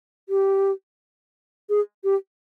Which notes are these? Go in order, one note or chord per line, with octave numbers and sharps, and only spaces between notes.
G4
G#4
G4